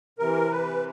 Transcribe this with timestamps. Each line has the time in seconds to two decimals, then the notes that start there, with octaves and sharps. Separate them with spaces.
0.19 C3 E3 A#4
0.51 B4